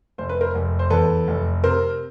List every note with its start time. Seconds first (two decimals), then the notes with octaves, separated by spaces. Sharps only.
0.18 F1 C5
0.29 B4
0.41 A#4 C5
0.55 F1
0.79 C5
0.90 E2 A4 B4
1.28 F1
1.64 C3 A#4 C5